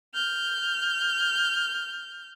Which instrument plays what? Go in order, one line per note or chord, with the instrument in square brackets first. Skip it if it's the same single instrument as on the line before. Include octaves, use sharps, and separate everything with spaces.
[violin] F6 G6